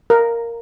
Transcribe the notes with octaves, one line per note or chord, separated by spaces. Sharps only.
A#4